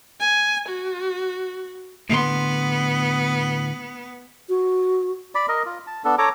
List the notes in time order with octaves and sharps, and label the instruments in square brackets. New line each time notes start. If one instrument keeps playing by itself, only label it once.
[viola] G#5
F#4
[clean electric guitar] A2 D3 C6 [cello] B3
[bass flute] F#4
[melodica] D5 B5
A#4 D#5
F4
A5
B3 D4 A4
A4 C#5 A#5 D6